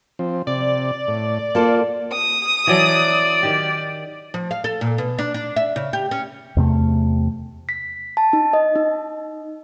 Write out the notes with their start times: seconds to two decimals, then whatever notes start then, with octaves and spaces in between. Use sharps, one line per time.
0.19 F3 C4
0.47 C3 D5
1.08 A2
1.55 A#3 F4 A4 C5
2.12 D#6
2.67 E3 F#3 A4 D5
3.43 D#3 G4
4.34 F3
4.51 F5
4.64 A4
4.81 A#2
4.98 B2
5.19 D4
5.34 D4
5.56 E5
5.76 C#3
5.93 G4
6.11 C#4
6.57 E2 C3 A3
7.69 B6
8.17 A5
8.33 D#4
8.53 D#5
8.76 D#4